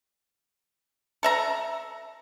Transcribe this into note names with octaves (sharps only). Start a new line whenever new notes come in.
A4 E5 A#5